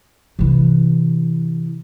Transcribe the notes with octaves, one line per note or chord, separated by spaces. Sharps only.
C3 E3